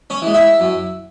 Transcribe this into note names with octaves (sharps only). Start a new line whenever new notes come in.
C#4 C#5
E3 G#3
E4 E5
F#2